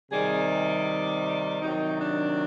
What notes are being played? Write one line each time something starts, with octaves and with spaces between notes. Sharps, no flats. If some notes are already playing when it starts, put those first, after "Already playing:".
C3 D#3 G3 G#4
C3 D#3 F#3 D#4
D4